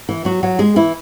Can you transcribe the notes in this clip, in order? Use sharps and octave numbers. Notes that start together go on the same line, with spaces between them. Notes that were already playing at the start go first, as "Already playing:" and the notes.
E3 E4
F#3 F#4
F#3 F#4
G#3 G#4
E3 E4